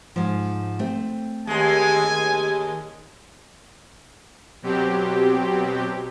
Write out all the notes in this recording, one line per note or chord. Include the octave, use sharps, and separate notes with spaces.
G#2 F3
A3 C4
D#2 G#3 G#5
B2 F#3 C4 G4